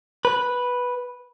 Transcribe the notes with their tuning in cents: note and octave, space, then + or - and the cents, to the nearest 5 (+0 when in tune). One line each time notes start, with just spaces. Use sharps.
B4 -5